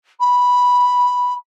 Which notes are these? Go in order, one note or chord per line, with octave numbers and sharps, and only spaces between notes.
B5